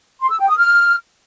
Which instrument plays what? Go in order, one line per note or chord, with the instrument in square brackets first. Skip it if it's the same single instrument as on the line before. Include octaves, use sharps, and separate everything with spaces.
[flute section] C6
E6
G5
D#6
F6